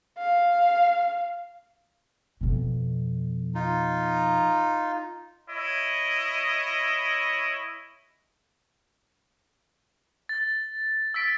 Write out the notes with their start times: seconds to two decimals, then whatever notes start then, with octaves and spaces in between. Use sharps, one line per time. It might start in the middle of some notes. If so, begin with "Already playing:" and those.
0.18 F5
2.41 F2 B2
3.55 D#4 F4
5.49 E4 C#5 D#5
10.29 A6
11.14 E6 A6 B6 D7